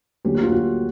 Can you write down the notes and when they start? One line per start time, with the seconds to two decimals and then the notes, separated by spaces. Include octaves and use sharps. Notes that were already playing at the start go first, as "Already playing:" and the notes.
0.25 D2 D3 F#3 A#3 C#4 G4
0.34 F#4
0.43 F4
0.52 F#4